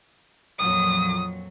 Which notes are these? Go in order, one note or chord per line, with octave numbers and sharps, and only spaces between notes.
F2 A#2 F#3 D#6